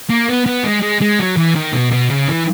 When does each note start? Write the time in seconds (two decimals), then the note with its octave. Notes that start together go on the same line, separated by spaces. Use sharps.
0.10 A#3
0.28 B3
0.46 B3
0.64 G#3
0.82 G#3
1.01 G#3
1.19 F#3
1.37 E3
1.55 D#3
1.74 B2
1.92 B2
2.10 C#3
2.29 E3